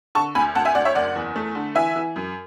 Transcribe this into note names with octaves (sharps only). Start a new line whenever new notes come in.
D3 A5 C#6
D2 G#5 B5
D2 F#5 A5
E5 G#5
D2 D5 F#5
C#5 E5
F#1 D5 F#5
E2
A3
D3
E3 E5 G#5
E3
F#2